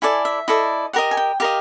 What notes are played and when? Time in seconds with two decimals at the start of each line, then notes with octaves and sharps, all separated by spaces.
0.02 E4 A4 D5 G#5
0.25 E5
0.48 E4 A4 D5 D#5
0.93 G4 A#4 D#5 F#5
1.11 G#5
1.17 G5
1.40 G4 A#4 D#5 F5